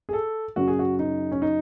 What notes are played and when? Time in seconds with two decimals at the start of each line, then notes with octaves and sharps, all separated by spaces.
0.09 G#4
0.13 A4
0.56 F#2 C#3 F#3 F#4
0.68 G#4
0.79 F#4
0.99 D#4
1.32 C#4
1.42 D#4